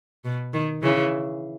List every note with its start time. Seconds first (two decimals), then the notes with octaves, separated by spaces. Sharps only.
0.25 B2
0.54 D#3
0.82 C#3 E3